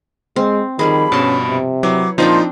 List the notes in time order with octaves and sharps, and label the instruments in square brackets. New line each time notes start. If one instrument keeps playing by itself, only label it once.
[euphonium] G#3 [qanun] C4
[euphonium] D#3 [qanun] F3 G3 G#4 [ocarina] B5
[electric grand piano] G2 B2 [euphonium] C#4 [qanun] A5 C6
[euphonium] C3
[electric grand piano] F#3 [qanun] E4 B4 C#5 [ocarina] D6
[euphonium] A#2 [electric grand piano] F3 D#4 F4 [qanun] C4 D4 G5 [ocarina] C6